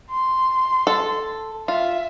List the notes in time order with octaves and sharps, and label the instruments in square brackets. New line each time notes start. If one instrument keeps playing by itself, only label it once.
[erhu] C6
[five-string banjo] A4
[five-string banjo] F4 [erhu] E5